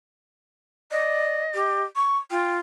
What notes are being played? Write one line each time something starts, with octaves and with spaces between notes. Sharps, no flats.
D5 D#5
G4
C#6
F4 G5